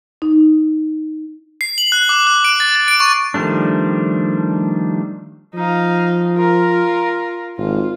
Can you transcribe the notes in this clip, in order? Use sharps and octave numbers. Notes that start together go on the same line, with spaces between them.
D#4
C7
F#7
F#6
D6
F#6
D7
A6
A6
D7
C#6
D#3 F3 G3 A3 D4
F3 D#4 F5
F4 A#4
G#1 F4